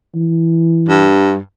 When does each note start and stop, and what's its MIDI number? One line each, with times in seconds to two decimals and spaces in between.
0.15 1.10 52
0.89 1.38 43